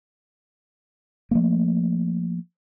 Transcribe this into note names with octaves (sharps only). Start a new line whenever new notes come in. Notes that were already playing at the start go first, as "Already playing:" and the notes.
F3 A3 A#3